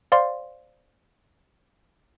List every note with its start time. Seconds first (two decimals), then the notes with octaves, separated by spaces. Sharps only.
0.12 C5 D5 F5 C6